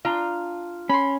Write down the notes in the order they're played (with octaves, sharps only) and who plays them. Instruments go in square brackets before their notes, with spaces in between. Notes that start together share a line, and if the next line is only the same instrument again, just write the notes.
[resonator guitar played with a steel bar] D4 F4 A#5
[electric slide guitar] C#4 [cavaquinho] B5 C6